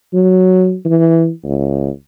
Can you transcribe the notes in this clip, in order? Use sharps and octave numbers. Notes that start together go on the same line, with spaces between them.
F#3
E3
C#2